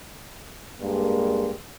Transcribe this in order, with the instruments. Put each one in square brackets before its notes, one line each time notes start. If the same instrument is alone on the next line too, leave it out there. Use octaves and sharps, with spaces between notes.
[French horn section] G2 G#3 A#3